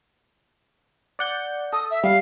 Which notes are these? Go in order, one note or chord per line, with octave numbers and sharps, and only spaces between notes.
D5 F#5 G6
A4 D#6
E5
G3 F5